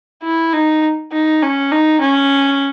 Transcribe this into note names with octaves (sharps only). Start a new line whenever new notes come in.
E4
D#4
D#4
C#4
D#4
C#4